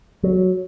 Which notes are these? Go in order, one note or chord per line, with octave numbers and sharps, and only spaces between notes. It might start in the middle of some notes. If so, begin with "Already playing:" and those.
F#3